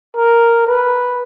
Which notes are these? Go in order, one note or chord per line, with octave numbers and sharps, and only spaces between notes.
A#4
B4